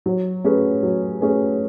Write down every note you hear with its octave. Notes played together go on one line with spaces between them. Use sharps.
F#3
A3 C#4 G#4 B4
F#3
A3 C#4 G#4 B4